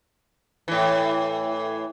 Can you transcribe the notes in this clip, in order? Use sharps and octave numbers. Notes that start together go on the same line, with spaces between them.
A2 E3